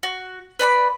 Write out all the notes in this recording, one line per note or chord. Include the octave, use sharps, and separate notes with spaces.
F#4
B4 D5 A#5 B5